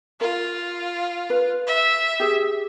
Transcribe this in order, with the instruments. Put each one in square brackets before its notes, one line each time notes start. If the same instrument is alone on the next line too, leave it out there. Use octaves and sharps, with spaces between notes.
[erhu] F4 [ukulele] A#4
[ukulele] B4
[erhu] E5
[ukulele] G4 G#4